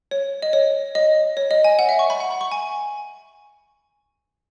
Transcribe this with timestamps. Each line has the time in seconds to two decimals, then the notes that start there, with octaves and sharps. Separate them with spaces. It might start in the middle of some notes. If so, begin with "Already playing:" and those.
0.11 C#5
0.42 D#5
0.53 C#5
0.95 D#5
1.37 C#5
1.51 D#5
1.64 G#5
1.79 F#5
1.89 E5
1.99 C#6
2.10 B5
2.20 F#5
2.31 B5
2.41 C#6
2.52 G#5